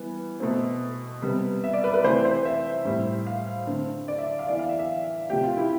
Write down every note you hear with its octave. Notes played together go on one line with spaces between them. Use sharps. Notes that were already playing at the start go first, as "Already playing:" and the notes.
Already playing: E3 G3 B3
B2 A3 C4
C3 G3 B3
E5
D5
B4
B4
C3 E3 A3 C4 C5
C5
E5
A2 G3 C4
F5
D3 A3 C4
D5
E5
F5
E3 B3 D5
F5
E5
E5
C3 F3 A3 G4
F4
E4